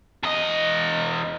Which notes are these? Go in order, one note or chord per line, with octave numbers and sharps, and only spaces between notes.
E2 D#5